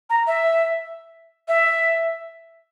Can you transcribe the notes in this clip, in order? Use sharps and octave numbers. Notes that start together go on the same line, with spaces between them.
A#5
E5
E5